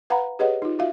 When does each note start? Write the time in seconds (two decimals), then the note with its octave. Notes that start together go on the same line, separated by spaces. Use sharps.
0.10 B4 F5 F#5 A#5 B5
0.39 G4 G#4 B4 C#5 D#5 F#5
0.62 D#4 F4
0.79 F4 F#4 E5 F5